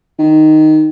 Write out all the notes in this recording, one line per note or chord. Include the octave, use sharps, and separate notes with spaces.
D#3